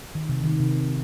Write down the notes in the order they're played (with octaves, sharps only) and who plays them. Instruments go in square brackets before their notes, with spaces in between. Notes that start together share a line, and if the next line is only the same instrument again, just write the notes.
[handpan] D#3
C3
D#3
C3